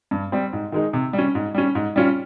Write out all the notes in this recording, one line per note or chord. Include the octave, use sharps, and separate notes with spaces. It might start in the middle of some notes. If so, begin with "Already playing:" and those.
G2
G3 C4
G#2
D#3 G#3 D#4
C3
G3
C#4
G#2
G3 C#4
G#2
G3 C#4 F4